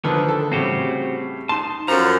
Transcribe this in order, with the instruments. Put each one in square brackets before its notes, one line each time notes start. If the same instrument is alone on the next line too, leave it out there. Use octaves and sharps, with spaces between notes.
[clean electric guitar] D3 [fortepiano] D#3 F3 B4
[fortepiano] A4
[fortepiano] A2 C#3 G3 [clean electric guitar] C4 F#4 G4
[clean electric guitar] D#4 A5 [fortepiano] C6
[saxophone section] F#2 F3 [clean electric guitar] A4 A#5